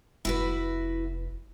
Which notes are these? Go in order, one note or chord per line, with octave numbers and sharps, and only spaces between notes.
F1 E4 F#4 B4